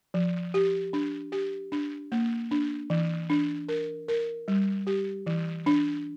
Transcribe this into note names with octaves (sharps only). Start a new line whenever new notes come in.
F3
G4
D4
G4
D4
A#3
D4
E3
D4
A#4
A#4
G3
G4
E3
D4